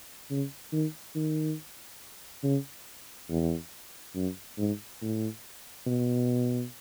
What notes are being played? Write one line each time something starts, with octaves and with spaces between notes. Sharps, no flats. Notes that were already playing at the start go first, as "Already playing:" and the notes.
C#3
D#3
D#3
C#3
E2
F#2
G#2
A2
B2